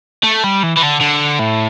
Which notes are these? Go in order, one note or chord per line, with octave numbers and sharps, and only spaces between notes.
A3
G3
E3
E3
D3
D3
A2